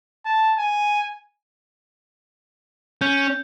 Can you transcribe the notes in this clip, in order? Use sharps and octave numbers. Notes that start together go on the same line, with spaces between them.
A5
G#5
C#4 G6